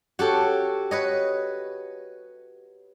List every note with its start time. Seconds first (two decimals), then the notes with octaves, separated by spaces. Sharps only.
0.19 F#4 G4 A4 C#5
0.91 B4 C#5 D#5